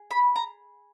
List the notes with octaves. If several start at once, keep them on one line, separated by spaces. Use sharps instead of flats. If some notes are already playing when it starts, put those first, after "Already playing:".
Already playing: G#4
B5
A#5